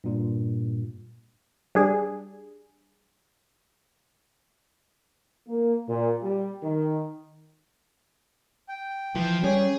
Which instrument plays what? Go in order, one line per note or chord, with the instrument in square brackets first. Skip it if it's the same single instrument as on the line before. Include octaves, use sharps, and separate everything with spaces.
[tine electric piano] G2 A#2
[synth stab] G3 D4 G#4
[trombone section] A#3
A#2
G3
D#3
[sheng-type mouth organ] G5
[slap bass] E3 [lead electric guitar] F3
[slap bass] G3 [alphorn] C#4 [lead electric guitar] G#4